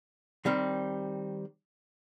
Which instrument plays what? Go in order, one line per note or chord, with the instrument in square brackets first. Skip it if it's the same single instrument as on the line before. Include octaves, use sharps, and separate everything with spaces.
[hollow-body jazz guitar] D#3 G3 C4